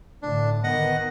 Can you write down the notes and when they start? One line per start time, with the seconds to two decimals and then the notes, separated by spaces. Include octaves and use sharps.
0.23 A2 D3 D4
0.64 D#3 B3 D#5 F#5